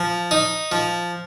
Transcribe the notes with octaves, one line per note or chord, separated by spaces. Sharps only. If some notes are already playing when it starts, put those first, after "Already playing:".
Already playing: F3
D#4
F3